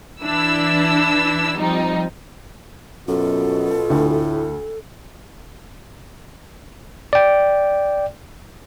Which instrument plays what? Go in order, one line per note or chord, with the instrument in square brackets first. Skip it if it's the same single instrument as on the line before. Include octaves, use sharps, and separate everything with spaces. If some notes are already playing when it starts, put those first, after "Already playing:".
[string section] E3 D4 E4 E6
F3 G3 C4 D#4
[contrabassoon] F#2 [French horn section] B2 F4 [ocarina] A4
[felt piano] D2 [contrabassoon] A2
[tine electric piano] D5 G5